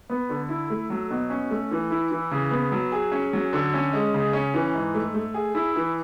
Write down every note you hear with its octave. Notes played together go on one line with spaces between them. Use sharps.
B3
D3
E4
A3
F#3
B2
C#4
A3
E3
E4
E3
C#3
B3
F#3
G#4
C#4
F#3
D3
C#4
G#3
C#3
C#4
E3
G#2
A3
A3
G#4
E4
E3